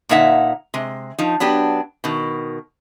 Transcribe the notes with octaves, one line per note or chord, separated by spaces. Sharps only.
A#2 D3 A#3 D#4 E5 F#5
C3 G#3
F3 D#4
F#3 B3 D4 G4
B2 D#3